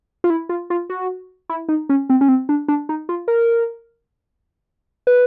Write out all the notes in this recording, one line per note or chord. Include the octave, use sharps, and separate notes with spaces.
F4
E4
F4
F4
F#4
E4
D#4
C#4
C4
C#4
C4
D4
D4
D#4
F4
A#4
B4